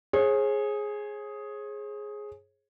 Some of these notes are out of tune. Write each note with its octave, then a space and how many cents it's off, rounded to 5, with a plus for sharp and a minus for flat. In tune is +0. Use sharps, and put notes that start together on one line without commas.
G#4 +5 C#5 -45